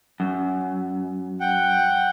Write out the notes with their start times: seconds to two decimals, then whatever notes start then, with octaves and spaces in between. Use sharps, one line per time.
0.20 F#2
1.40 F#5 G5